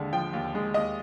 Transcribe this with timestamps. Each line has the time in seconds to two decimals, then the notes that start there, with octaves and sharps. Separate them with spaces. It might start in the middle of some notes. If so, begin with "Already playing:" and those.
Already playing: D#2 D3 G#3
0.13 F3 G5
0.33 D#2
0.55 G#3
0.74 D#2 D#5